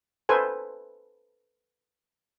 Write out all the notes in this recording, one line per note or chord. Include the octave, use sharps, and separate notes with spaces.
A4 B4 C5 G#5